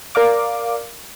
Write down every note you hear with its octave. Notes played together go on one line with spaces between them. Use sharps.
A#4 D5 F5 D6